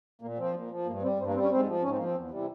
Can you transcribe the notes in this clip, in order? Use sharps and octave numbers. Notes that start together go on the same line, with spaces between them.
A#2 A#3
F3 C4
A#2
F3
G2 A#3
G3 C4
G2 C4
A#3
G3 C4
C#4
G#2 C4
F3
G#2 C#4
C4
F3 A#3
C4
E2
C3 E3 G3